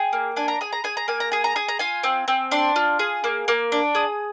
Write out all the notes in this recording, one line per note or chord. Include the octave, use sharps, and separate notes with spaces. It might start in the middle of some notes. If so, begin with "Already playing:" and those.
Already playing: G#4 G5
A#3
D4 G#5
A#5
G#4 G#5
A#5
G#4 G#5
A#5
A#3 G#5
A#5
G#4 G#5
A#5
G#4 G#5
A#5
F4 G#5
C4
C4
D4 C6
F4
G#4
A#3
A#3
D4
G#4 D#6